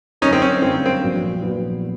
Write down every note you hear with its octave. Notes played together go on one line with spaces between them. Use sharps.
F#2 D3 G3 A#3 C#4 D#4
C4
C#4
F#2 D3 G3 A#3 C4
C4
A#1 A#2 F#3 B3
A#1 A#2 F#3 B3